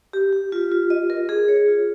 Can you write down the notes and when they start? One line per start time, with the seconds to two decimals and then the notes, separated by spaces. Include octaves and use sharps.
0.13 G4
0.33 G4
0.52 F4
0.72 F4
0.90 D#5
1.10 A#4
1.29 G#4
1.48 C#5
1.68 F4